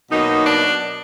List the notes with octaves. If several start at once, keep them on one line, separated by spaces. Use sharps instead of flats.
B2 F#3 A#3 D#4
D4